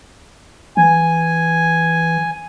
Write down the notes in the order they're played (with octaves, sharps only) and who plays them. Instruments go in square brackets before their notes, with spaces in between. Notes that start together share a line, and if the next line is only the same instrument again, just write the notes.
[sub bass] E3 [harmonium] G#5